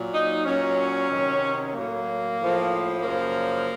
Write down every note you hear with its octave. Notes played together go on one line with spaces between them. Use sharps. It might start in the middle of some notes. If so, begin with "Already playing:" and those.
Already playing: A#2 F#3
D#4
A#2 F#3 C#4
C3 D#3 F#3
A2 F#3 A#3
A2 F3
F#2 C#3 F3 A#3